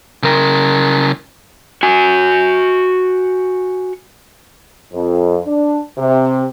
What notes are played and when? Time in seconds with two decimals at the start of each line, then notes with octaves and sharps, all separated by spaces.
0.23 C#3 A#4
1.83 F#4 G#5
4.92 F2
5.47 D4
5.97 C3